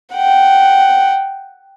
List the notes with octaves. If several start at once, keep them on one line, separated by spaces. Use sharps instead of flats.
F#5 G5